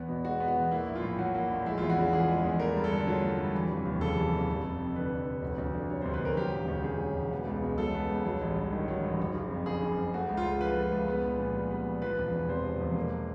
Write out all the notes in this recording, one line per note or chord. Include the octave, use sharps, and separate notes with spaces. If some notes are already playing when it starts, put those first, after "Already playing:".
Already playing: E2 B3
B2
G#3 F#4
B3
F#4
E2
A#3 E4
A#1
F4
A2
F#3 F#4
A#3
A#1
G#3 E4
F4
E2
F#4
C#3 F4
E3 G#4
G#3
E2
A3 A#4
G2
A4
D3
F#3 F4
A3
G2
E3
F1
D#2
C#3 A4
E3
F1
F1
F1
F2
D3 B4
F1
F1
D2
D2
D3
G3 C#5
C5
D2
B4
D2 A#4
F#3 G4
E1
D2
C#3 G#4
F#3
E1
B3
C#2
B2
F#3 A4
B3
C#2
F#3
A1
G2
D#3
F#3
A1
F#1
F#1
F2
C#3 G#4
F#1
F#1
A3 F#4
C#2
F4
C#3
F3 B4
A3
C#2
B3
A#1
A#2
G3
B3
A#1
F3 B4
E1
E2
C3 C5
F3
E1
A#3